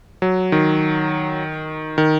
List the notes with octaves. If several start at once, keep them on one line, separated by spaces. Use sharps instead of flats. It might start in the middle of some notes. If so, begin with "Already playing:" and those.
F#3
D#3
D#3